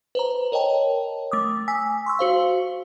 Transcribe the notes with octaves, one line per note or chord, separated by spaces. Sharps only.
B4 C5 A#5
A#4 C#5 D#5 G5 A5
A3 D6 D#6
G#5 E6 B6
C6 C#6 E6
F#4 C5 F5